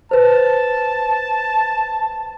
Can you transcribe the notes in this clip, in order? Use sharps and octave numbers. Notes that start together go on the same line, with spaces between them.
B4 C5 A5